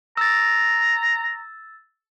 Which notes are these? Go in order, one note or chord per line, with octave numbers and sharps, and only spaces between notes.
A#5 E6 A6